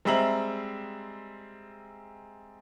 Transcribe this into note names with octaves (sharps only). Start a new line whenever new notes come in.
G3 G#3 C4 E5 A#5 F#7